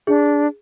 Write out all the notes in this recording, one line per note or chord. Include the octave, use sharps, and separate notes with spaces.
D4 G#4